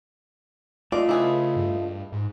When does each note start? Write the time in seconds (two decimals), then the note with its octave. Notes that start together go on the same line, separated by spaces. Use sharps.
0.92 A3 F4 D5 D#5
1.09 C#3 E4 G#4 B4
1.56 G2
2.12 G#2